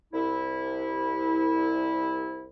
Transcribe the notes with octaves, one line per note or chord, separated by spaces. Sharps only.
C2 E4